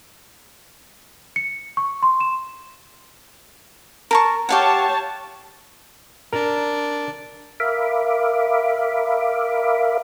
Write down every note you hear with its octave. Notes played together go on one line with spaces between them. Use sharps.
C#7
C#6
C6
E7
A#4 A5 C#6
G4 C#5 F5 F#5 A5
D4 A#4
A#4 E5 F5 B5 D6